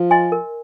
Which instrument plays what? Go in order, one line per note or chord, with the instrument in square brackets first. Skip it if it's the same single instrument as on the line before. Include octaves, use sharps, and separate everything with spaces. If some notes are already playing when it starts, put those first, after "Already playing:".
Already playing: [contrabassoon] F3
[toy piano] D#5 G#5 C6
A#4